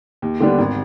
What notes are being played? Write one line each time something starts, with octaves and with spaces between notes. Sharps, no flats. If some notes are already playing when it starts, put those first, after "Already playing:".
D#2
D3 G3 B3 D4
G#1